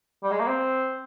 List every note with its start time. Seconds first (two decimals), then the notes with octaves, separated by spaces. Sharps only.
0.23 G3
0.31 G#3
0.40 A#3
0.47 C4